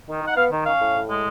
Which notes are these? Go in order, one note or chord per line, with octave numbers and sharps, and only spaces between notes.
D#3
D#4 F#5
B3 F5
D#3
C#4 F5
A2
A2
G#3